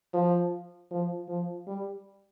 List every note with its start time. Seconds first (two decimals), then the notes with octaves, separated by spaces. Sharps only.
0.14 F3
0.91 F3
1.28 F3
1.67 G3